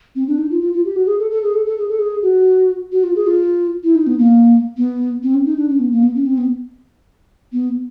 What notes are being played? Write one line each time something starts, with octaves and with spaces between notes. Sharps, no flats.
C4
D4
D#4
F4
F4
F4
G4
F#4
G#4
A4
A4
G#4
A4
A4
G#4
A4
G#4
F#4
F#4
F4
G#4
F4
E4
D#4
B3
A#3
B3
C4
C#4
D#4
D4
C#4
B3
A#3
B3
C#4
C4
B3
B3